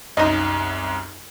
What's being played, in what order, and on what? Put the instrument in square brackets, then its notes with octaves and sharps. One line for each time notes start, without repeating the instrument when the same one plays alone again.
[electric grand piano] C2 F#2 [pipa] D#4 D#5